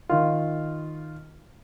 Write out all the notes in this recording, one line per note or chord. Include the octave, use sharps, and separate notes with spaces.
D#3 F4